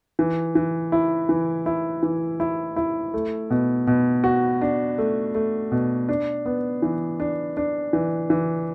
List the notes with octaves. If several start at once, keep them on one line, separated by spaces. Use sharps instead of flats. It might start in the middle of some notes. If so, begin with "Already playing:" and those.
E3
E3
E4
E3
E4
E3
E4
E4
A3
B2
B2
F#4
D4
A3
A3
B2
D4
B3
E3
D4
D4
E3
E3